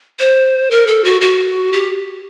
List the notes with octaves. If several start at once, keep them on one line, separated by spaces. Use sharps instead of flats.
C5
A#4
A4
F#4
F#4
G4